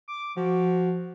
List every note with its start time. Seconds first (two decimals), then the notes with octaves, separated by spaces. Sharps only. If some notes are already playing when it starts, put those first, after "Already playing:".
0.08 D6
0.37 F3 F#4